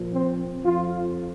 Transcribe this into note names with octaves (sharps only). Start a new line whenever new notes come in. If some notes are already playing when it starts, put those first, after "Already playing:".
Already playing: A#2 F3
C4
F2 F3 F4